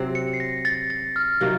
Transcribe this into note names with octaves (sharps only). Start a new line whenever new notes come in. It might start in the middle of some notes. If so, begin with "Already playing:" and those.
Already playing: C3 F#3 C4
C#7
C7
A#6
A6
A6
F6
C3 D#3 F#3 A#3